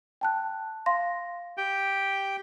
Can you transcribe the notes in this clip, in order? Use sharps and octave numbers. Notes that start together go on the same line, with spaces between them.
G5 A5 F#6
F5 C6 A#6
G4 G5